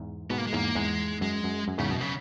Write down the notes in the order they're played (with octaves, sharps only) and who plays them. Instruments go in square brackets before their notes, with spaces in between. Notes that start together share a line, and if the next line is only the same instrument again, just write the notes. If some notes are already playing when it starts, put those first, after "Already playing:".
Already playing: [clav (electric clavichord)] E2 G#2
[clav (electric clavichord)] G#2 B2 [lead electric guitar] B3
[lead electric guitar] A#3
G#3
[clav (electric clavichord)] E2 G#2 [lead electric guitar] A#3
[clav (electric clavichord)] E2 G#2 [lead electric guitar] G#3
[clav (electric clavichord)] F#2 [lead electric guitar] G#3
[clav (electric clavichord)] F#2
F#2
[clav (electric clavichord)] E2 G#2 [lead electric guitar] C#3
[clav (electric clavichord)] F#2 [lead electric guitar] B2
[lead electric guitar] C#3